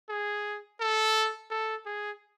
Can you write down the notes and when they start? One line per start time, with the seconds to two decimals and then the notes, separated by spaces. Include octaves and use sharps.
0.09 G#4
0.80 A4
1.51 A4
1.86 G#4